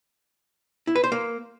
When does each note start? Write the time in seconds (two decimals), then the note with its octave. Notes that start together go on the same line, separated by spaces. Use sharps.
0.87 E4
0.96 B4
1.04 C5
1.12 A#3